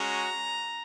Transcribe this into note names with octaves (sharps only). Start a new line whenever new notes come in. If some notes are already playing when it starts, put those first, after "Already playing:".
Already playing: G#3 C#4 F#4 A#5